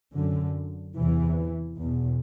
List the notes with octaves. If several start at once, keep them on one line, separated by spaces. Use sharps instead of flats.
F#2 D3
E2 C3 E3
E2 B2